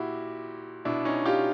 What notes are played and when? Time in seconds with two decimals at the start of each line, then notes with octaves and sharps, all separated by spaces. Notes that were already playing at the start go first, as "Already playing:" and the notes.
Already playing: A#2 E4 F#4 G4
0.85 B2 D4 E4
1.05 C#4 D#4
1.26 F4 G4